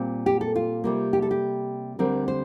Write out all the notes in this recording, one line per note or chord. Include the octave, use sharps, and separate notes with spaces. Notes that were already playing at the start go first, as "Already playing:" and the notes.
Already playing: A#2 G3 C4
G4
A4
F4
C3 G3 A#3
G4
A4
G4
D2 D3 G3 C4 A#4
C5